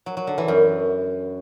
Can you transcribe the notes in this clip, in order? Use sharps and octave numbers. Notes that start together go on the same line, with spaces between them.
F#3
F#3
D3
E3
F#2